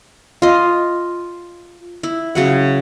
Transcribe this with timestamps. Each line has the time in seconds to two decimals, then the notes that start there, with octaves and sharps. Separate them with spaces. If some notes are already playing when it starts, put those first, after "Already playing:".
0.42 F4 D#5
2.03 E4
2.35 C#3 F#3 F#5